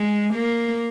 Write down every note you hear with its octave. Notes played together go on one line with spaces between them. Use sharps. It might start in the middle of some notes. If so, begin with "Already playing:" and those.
Already playing: G#3
A#3